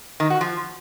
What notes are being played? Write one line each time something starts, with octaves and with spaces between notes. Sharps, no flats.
D#3
F#4
F3